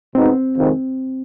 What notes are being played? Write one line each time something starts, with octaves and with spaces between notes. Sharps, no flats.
B2 G#3 B3 C4 D#4
F2 C3 D#3 G#3